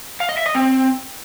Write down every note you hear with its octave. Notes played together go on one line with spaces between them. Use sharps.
F5
D#5
E5
D#5
C4